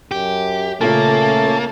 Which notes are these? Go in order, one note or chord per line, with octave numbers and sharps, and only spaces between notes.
F#2 G4
A#2 C#3 A3 A#3 C#4 A4 A5